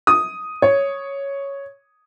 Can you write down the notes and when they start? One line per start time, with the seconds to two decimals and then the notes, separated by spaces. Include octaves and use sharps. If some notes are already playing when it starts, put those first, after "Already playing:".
0.07 D#6
0.62 C#5